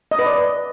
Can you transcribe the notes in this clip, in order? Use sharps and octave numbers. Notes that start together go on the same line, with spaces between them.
D#5
B4
D5